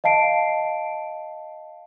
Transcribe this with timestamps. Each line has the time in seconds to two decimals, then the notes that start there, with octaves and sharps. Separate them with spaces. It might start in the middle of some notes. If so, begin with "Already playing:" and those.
0.04 D#5 F5 A5 C7 D7